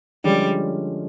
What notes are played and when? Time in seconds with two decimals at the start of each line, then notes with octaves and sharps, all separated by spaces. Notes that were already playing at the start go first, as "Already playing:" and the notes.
0.24 D3 F3 G3 G#3 C#4 F4